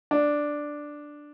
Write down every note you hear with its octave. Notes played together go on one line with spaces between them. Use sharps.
D4